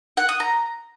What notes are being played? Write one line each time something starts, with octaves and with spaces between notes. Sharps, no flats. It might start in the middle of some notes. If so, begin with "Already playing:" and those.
F#5
D#6
A#5